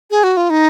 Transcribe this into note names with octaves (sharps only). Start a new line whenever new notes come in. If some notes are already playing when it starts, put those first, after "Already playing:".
G#4
F#4
F4
D#4